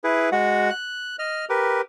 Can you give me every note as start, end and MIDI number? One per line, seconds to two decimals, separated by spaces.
0.04 0.30 64
0.04 0.30 68
0.04 0.30 71
0.32 0.70 56
0.32 0.70 66
0.32 0.70 78
0.70 1.16 90
1.19 1.45 75
1.19 1.45 89
1.49 1.81 67
1.49 1.81 70
1.49 1.81 71